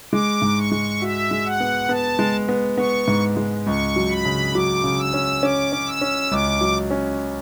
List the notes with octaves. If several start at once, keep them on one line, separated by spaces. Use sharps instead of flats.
G#3 D6
G#2
C#6
G#3
F#4 E5
G#3
F#5
B3
B3 A5
G#3
B3
B3 C#6
G#2
G#3
C#2 C#6
F#3
B5
C#3
F#3 D6
C#3
E6
C#4
C#4 D6
C#4
E6
C#4
C#2 D6
F#3
C#4